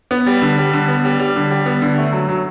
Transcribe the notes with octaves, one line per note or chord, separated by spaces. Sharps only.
B3
G3
D3
G3
D3
B3
G3
G3
D3
G3
B3
D3
A3
F#3
F#3